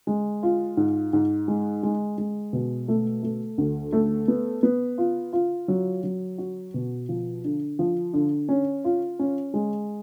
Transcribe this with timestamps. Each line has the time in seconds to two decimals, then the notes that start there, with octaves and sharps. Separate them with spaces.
0.07 G#3
0.43 F4
0.77 G#2
1.13 G#2
1.48 G#3
1.83 G#3
2.18 G#3
2.53 B2
2.88 A3
3.23 A3
3.58 D2
3.92 A3
4.28 B3
4.63 B3
4.98 F4
5.33 F4
5.68 F#3
6.03 F#3
6.38 F#4
6.74 B2
7.09 F3
7.44 D3
7.79 F3
8.13 D3
8.49 C#4
8.84 F4
9.19 C#4
9.54 G#3